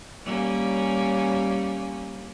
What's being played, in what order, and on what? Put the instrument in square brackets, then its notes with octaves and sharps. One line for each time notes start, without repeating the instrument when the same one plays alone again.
[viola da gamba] G3 A#3 C#4